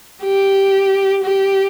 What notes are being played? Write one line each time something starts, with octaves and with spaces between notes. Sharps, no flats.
G4
G4